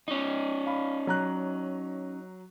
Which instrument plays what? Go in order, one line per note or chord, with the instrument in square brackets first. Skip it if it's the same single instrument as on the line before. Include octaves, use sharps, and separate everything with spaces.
[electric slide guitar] C#4 D#4
[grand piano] F5 B5
F#3 A#5 F#6